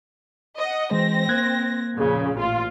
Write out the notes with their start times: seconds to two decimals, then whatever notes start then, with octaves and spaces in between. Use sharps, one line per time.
0.58 D#5 F#5
0.91 E3 G#3 C4 A#6
1.29 A#3 F#6 G#6
1.96 F2 A#2 C#3
2.37 A1 F4